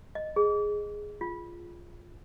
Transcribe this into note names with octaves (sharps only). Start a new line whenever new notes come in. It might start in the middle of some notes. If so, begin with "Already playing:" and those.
D#5
G#4
F4